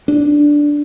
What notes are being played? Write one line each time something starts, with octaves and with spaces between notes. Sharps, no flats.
D4